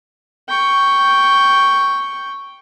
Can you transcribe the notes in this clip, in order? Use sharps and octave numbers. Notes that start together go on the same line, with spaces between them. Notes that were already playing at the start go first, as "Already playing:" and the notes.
G5 C#6